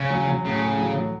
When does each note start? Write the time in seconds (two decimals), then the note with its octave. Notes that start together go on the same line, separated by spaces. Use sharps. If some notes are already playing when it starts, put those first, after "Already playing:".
Already playing: C#3 C#4
0.10 F#3
0.27 F#3
0.45 A2 C#3
0.61 A2
0.78 F#3
0.95 F#3